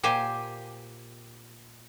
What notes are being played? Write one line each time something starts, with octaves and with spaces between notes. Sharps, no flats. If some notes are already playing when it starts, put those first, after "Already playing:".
A#2 G4 C5 G#5